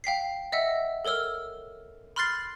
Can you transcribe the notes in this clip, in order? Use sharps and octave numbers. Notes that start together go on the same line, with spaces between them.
F5 G5 B6 C7
D#5 E5 F#5 E6
A4 A#4 C#5 E6 F6
B5 C6 F6 F#6 A6 C7